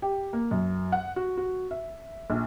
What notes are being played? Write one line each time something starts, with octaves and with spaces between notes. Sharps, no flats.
G4
A#3
F#2
F#5
F#4
F#4
E5
A#1